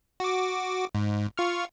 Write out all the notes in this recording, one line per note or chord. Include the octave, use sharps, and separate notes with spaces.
F#4 D6
G#2
F4 C#6 F6